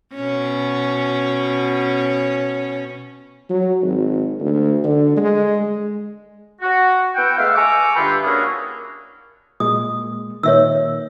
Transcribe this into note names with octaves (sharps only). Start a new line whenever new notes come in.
B2 C#4
F#3
G#1
D2
D3
G#3
F#4
B3 E4 F#5 G5
G#3 A3 E5 F5
G#5 A#5 C#6 D6 E6
G2 D3 F4 B4 E5 G5
A#3 C#4 D4 E4 F#4 G#4
A#2 G#3 D#6
A#2 D#3 C#5 E5 E6